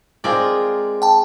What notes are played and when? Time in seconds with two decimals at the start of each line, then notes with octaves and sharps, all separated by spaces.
0.24 G#3 C4 F4 A#4 D5
1.02 G5 A5